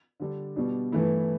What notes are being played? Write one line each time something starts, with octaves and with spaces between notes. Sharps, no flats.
D3 G3 D4
B2 G3 D4
G2 E3 A3 E4